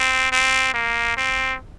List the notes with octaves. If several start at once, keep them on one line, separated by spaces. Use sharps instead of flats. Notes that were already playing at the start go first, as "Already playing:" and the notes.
Already playing: C4
C4
A#3
C4